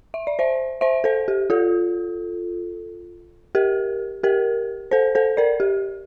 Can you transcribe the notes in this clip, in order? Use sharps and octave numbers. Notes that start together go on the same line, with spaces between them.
E5
D5
C5 E5
C5 E5
A4 C5
G4
F4 A4
G4 A#4
G4 A#4
A4 C5
A4 C5
A#4 D5
G4